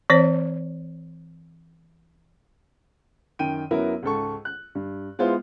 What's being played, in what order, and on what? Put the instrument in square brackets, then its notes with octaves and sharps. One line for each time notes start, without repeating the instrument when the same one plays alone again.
[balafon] E3 C4 C5 C#5
[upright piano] F#2 D#3 G5 D#7
F#2 F#3 B3 E4 A#4
C#2 G#2 A4 C#6
F#6
G2
G#3 B3 E4 F4 C5